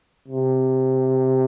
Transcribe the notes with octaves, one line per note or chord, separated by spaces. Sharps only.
C3